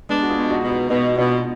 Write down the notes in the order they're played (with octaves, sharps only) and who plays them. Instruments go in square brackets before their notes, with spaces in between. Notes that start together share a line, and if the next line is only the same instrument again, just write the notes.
[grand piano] G#3 B3 [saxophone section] D4
[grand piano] F#4
F4 G#4
[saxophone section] B2
[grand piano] D#4 F#4
[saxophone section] B2
[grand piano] D#4 F#4
[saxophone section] B2 [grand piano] D#4 F#4
[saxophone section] B2 [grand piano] D4 F4